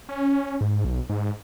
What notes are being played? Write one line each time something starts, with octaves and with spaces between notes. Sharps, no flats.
C#4
G#2
B1
G#2